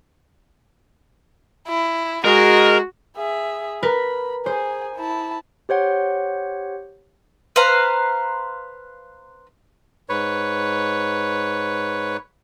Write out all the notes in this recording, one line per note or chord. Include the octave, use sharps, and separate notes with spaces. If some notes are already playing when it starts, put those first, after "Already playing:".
E4
G#3 F#4 A#4
G#4 E5
A#4 B4 B5
G#4 C5 G#5
E4 A5
G4 C5 C#5 F#5
B4 C5 F5 A#5
G#2 B4 C#5